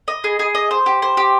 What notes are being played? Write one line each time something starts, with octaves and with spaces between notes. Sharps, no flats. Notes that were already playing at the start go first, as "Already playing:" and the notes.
D#5
G#4
G#4
D#5
C5
G4
C5
G4